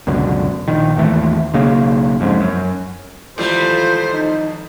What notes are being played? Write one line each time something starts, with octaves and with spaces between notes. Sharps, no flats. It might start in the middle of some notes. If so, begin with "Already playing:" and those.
C#2 F#2 B2 D3
A#1 D#3
G#1 D#2 E3 A3
B1 C#3 A#3
F#1 F2 G#2
F#2
G#1 F2 E3 G3 A3 F4 C5
D#4